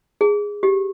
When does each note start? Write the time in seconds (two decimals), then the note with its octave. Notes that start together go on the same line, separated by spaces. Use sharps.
0.21 G#4
0.63 G4